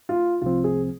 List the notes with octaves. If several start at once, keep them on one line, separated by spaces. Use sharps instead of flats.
F4
C2 C3 F3 C4 F4
G#4